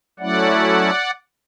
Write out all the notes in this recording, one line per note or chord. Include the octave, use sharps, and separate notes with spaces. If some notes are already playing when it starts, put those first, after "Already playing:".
F#3 A3 C#4 E4 D5 F#5